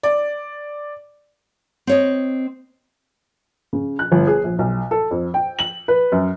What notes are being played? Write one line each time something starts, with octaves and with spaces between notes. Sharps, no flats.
D5
C4 C#5 D#5
C#3
F#6
G1
G#4
A#1
B1
A4
F2
G5
F#7
B4
F#2